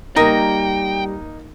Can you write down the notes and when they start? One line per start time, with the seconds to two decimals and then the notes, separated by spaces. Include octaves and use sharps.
0.16 G3 A#3 D#4 A#4 D#5 G5 A#5